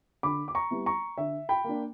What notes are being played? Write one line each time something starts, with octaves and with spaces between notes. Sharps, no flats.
D3 B5 D6
D6
A#5 C#6
G3 B3 E4
A#5 C#6
D3 E5
G5 B5
A#3 D4